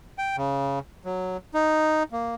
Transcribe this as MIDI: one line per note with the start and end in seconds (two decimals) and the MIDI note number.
0.18 0.36 79
0.37 0.79 49
1.05 1.37 54
1.54 2.03 63
2.12 2.35 58